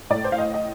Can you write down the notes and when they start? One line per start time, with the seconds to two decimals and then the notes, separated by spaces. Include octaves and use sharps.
0.10 A2 A3 D5
0.24 C5
0.32 F5
0.38 D#5
0.54 D#5